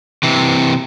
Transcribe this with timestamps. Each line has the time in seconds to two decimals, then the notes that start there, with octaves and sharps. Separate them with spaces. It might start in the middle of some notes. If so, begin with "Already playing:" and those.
0.23 C3 E3